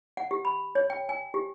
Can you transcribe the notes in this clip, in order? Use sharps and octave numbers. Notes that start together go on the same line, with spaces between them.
F#5
G4
B5
C#5
G5
G#5
G4